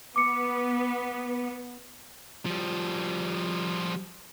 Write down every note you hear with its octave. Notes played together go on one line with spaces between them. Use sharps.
B3 D6 C#7
F3 G3